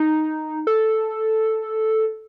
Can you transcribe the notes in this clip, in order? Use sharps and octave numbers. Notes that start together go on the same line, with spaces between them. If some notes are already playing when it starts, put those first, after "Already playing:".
Already playing: D#4
A4